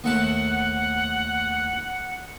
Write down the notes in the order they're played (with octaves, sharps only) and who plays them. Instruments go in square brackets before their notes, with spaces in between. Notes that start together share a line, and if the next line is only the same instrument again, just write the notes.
[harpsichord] D#2 A3 A5 [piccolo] F#5